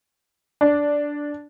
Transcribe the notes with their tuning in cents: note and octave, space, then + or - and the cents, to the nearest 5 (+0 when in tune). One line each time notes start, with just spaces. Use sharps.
D4 -10